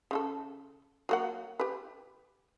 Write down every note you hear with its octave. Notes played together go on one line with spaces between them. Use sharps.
C#3 F4 A4
F#3 A#3 F#5
G4 B4